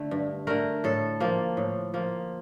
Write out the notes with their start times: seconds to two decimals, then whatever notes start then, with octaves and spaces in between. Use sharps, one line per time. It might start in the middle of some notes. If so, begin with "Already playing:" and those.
Already playing: D3 A3
0.11 G2
0.47 D3 A3 A#4
0.84 A2 A4
1.20 F3 A#3
1.57 A2
1.94 F3 A#3